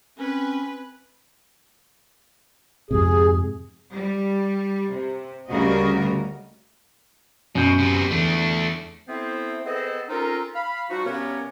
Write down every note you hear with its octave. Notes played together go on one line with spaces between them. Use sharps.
C4 C#4 B4
F2 G#2 C3 G#4
G3
C3
D2 C#3 G3 F#4 A#4 D#5
F#2 B2 G6
C3 B3
E2 A3 D4
A3 B3 C4 E4 C5
B3 C4 G#4 A4 C5 D#5
C4 C#4 D#4 F4 A4 A#4
F5 B5
F3 G3 D#4 F#4
G2 C3 B3 C#4 A#4 C#5